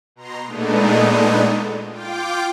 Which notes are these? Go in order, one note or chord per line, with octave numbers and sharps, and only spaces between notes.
B2 A#5 C6
A#2 G#3 A3 B3 D4 D#4
F4 G5 D6